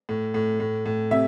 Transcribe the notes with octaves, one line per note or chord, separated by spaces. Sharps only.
A2
A2
A2
A2
C3 E5